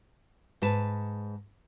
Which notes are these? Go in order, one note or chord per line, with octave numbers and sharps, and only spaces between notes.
G#2 B4 A5